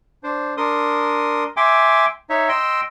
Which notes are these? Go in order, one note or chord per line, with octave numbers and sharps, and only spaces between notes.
D4 C5
D4 A#4 C6 D#6
E5 G5 G#5 C6 D6
D#4 C#5 E5
D#5 G5 C6 E6